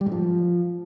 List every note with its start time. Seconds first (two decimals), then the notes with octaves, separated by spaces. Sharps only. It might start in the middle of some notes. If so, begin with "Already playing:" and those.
0.01 G3
0.06 G#2
0.12 F3